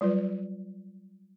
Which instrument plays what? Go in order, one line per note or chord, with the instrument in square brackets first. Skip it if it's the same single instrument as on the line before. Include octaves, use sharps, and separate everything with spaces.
[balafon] F#3 G3 F4 B4